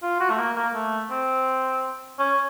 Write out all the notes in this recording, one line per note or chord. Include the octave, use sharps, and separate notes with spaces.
F4
F#4
A3
A#3
A#3
A3
C4
C#4